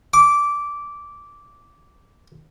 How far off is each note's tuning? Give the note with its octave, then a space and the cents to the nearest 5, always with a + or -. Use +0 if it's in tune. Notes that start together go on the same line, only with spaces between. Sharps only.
D6 -15